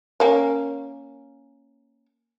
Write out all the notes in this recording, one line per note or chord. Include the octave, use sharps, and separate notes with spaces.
A#3 C#4